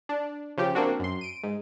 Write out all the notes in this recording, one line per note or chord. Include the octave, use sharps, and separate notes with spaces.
D4
C#3 F3 G4
A#3 C4 D4 F#4
F#2 C6
D7 D#7
G#2